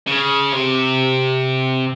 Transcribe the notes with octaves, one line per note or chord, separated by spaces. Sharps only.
C#3
C3